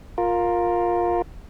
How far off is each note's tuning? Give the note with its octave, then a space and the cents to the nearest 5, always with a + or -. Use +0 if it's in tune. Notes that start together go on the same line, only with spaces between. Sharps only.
F4 +15 A#4 +0